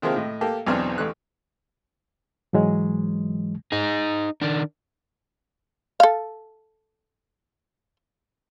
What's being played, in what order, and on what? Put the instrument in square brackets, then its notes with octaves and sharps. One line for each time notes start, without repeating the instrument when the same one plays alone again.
[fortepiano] C3 D#3 F3 G#3 A#3
A2 D#5
A#3 G4 A4
B1 E2 B2 C4 D4 F6
A1 D3 F#6
[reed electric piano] G#2 E3 F#3 G#3
[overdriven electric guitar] D#4 G#4
D#3 D4
[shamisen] A4 F5